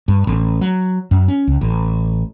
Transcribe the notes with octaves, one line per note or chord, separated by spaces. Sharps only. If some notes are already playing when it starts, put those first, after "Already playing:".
G2
A1
F#3
F#2
C#4
C#2
A1